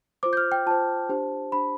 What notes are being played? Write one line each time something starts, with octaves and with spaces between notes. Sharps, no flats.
F4 C5 D6
G6
F6
G5
F4 C5 A5
D4 G4 C5
D4 G4 C5 B5